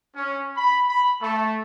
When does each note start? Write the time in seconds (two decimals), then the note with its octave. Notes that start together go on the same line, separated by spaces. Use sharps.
0.16 C#4
0.57 B5
0.88 B5
1.22 A3